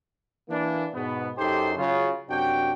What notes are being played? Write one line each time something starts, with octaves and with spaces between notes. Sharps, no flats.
E3 A#3 D4
G#2 B2 B3
F#2 D#4 G4 A4 C5 C6
C#3 F#3 F4
F#2 C3 D4 F#4 G5